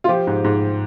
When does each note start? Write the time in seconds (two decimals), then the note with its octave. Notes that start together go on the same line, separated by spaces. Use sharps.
0.04 F4
0.08 F3 G4
0.27 G#2
0.44 G#2